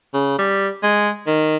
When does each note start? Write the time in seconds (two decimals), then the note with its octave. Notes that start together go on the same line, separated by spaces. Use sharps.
0.14 C#3
0.39 G3
0.83 G#3
1.27 D#3